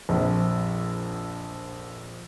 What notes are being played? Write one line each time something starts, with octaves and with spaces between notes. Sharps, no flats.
A#1 F2